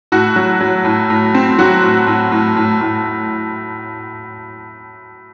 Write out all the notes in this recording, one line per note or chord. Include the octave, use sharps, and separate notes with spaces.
A2 F#4
F#3
F#3
A2
A2
C4
F#3 F#4
A2
A2
A2
A2
A2